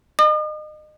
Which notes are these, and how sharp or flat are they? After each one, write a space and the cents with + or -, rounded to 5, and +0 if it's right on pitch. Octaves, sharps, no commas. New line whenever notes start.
D#5 -30 D#6 -45